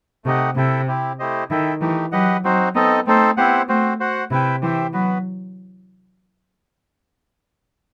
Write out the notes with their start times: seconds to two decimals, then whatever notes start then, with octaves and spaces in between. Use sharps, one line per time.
0.25 C3 A3 D#4 G4 D#5 F#5
0.56 C3 E4 A4 E5 G5
0.88 C4 E4 G4
1.19 A3 E4 G4 C5 D#5
1.50 D#3 E4 A4 E5 G5
1.81 E3 A3 D#4 G4
2.12 F#3 G4 B4 D#5 F#5
2.44 F#3 C4 D#4 F#4 C5
2.75 B3 C4 D#4 A4 D#5
3.06 A3 C4 D#4 A4 C5
3.37 B3 C4 E4 G4 C5 F#5
3.68 A3 C4 F#4 C5
4.00 F#4 C5 F#5
4.31 C3 E4 B4 E5 G5
4.62 E3 G4 C5 E5 G5
4.93 F#3 B3 F#4 B4